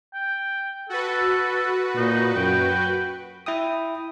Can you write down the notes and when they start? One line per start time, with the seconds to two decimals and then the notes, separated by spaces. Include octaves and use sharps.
0.14 G5
0.90 F#4 A4 B4
1.96 A#2 D#4
2.35 F#2 G5
3.46 E4 E5 G5 D#6